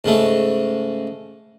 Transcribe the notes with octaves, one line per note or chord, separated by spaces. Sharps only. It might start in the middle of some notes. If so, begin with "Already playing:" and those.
G#2 C#3 A3